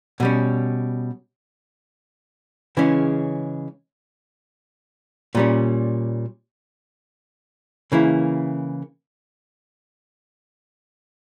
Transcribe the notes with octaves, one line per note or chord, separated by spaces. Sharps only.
B2 G3 C#4
C#3 E3 G#3 C#4
A#2 G3 C#4
C#3 E3 A#3 E4